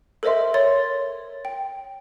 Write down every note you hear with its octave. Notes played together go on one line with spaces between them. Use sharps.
A4 A#4 C5 D#5 E5 C6
C#5 C6 A6
G5